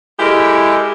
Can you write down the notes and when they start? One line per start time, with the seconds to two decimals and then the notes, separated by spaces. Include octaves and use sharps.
0.18 G#3 E4 G4 A4 A#4